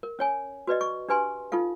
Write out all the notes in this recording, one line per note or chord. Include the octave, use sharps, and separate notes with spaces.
A#4
C#4 C#5 G#5
F#4 B4 D5 D#5
C#6
D4 G4 B4 G#5 C6
D#4 F4 A4 F5